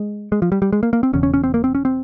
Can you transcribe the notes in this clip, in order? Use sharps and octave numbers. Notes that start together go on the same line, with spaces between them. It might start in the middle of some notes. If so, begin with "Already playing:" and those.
Already playing: G#3
G#3
F3
G3
G3
G#3
A#3
A#3
C4
E1 E2 C#3 C#4
C#4
C#4
C4
A#3
C4
C#4
C4